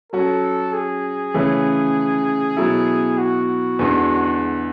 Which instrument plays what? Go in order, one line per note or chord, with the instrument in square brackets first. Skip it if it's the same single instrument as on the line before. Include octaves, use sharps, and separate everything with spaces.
[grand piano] F#3 C#4 F#4 [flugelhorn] A4
[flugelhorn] G#4
[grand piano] C#3 E3 A3 C#4
B2 F#3 B3 E4 A4
[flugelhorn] F#4
[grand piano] E2 D3 G#3